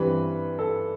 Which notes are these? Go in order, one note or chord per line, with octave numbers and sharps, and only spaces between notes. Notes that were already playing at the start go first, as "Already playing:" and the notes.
Already playing: G2 E3 G3 C4 B4
A4